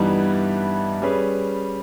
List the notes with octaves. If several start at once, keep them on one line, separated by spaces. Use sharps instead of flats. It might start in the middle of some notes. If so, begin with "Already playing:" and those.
Already playing: G2 E3 G3 B3 D#4
G3 C#4 G#4 B4